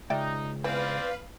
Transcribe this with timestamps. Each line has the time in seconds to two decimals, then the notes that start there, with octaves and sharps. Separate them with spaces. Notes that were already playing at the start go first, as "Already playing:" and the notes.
0.10 C#2 D#4 D5 E5 G5
0.64 E3 B3 C4 B4 D5 F5